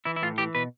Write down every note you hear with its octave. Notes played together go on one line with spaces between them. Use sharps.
E3 E4
E4
A2 F4
E3 G4
B2 B4